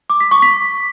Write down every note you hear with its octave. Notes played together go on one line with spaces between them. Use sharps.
D6
B6
C#6
B6